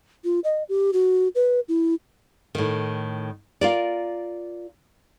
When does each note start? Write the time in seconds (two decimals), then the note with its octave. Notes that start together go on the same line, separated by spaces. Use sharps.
0.24 F4
0.44 D#5
0.69 G4
0.93 F#4
1.35 B4
1.69 E4
2.55 A2 D#3
3.61 F4 A#4 D5